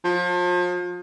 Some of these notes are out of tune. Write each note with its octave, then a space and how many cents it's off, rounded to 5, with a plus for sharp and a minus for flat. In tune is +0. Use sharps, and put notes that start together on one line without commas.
F3 +35